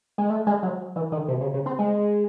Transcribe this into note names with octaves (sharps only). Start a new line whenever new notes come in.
G#3
A3
G#3
F#3
E3
D#3
C3
C#3
C#3
C4
G#3